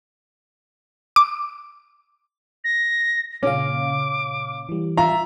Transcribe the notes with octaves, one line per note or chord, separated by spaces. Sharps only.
D6
A#6
A#2 C#3 C#4 F5 D6
E3 G3
F4 E5 A#5